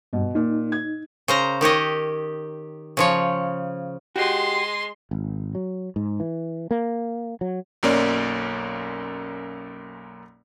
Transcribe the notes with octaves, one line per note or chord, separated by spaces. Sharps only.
G2 B2
A#2 D#4
G#6
C#3 C5 A#5
D#3 G4 C#5 D#5
C#3 F3 C#5
G#3 F#4 G4 C6
G#1
F#3
G#2
E3
A#3
F#3
B1 F#2 A#3 C#4 D5